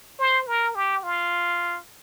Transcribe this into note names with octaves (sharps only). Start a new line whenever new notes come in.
C5
A#4
G4
F4